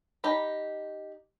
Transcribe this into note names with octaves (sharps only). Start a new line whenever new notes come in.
D#4 G4 B5